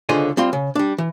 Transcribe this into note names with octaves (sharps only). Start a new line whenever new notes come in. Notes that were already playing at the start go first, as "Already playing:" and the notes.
C#2 D3 F4 G#4 C5 D#5
G3 C4 F4 C6
C#3
G3 D4
E3